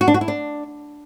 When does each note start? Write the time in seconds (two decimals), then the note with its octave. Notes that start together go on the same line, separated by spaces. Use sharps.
0.01 F#4
0.08 D4
0.14 F#4
0.21 E4
0.28 D4